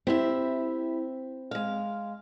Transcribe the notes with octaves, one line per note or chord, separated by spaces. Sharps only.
C4 E4 G4 E5
G#3 F5